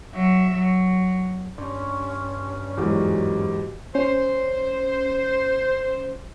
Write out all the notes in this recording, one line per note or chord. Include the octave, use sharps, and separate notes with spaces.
F#3 E5
F#3
G2 C#4 C6 C#6
E2 G#2 F#3 F#4 G4 A#4
C#4 C5